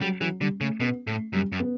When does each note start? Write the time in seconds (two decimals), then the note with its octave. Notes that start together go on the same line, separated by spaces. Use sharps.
0.01 F#3 G3
0.21 E3 F#3
0.40 D3 G3
0.61 C#3 A3
0.80 B2 B3
1.07 A2 A3
1.33 F#2 G3
1.52 F#2
1.60 B3